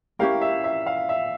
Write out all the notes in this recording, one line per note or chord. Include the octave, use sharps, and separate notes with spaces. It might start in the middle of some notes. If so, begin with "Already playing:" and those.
C#4 E4 G4 A#4 F5
E5
E5
F5
E5